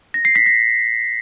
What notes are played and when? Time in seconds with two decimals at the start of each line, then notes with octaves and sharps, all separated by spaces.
0.14 A#6
0.25 C7
0.36 B6
0.46 A#6